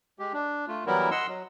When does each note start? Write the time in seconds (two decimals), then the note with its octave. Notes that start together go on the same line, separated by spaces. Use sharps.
0.19 G#3 G4
0.33 D4
0.68 A3 F4
0.86 E3 F#3 G3 B3 E4 A#4
1.11 D#5 F#5 C6 E6
1.28 F#3